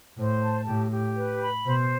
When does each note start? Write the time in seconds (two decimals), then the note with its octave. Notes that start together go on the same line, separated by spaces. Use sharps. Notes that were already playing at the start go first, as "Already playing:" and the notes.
0.17 A2 C5
0.42 A5
0.66 A2 G4
0.91 G4
1.16 B4
1.41 B5
1.65 B2 C5